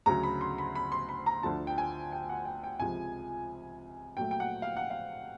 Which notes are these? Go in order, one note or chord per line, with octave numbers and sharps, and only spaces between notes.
D2 C#3 F#3 A#5
B5
C6
B5
B5
C6
B5
A#5
D2 D3 F3 A5
G5
G#5
G5
F#5
G5
G5
C#2 C3 F3 G#5
A#2 F#3 A3 G5
G5
F#5
F5
F#5
F5